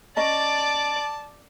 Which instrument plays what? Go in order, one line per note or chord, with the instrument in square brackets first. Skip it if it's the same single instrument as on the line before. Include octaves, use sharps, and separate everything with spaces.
[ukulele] C#4 D#5 A#5 [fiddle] D5 D6 [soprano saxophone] A5